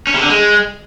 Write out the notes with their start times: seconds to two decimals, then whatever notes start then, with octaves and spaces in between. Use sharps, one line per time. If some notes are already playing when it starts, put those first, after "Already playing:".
0.07 C#4
0.14 C3
0.22 D3
0.29 G#3